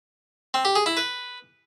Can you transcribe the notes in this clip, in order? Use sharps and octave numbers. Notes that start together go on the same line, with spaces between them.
C4
G4
G#4
E4
B4